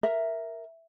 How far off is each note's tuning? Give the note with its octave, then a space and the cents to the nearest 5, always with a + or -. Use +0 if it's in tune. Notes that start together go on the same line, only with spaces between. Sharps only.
A#4 +0 E5 +0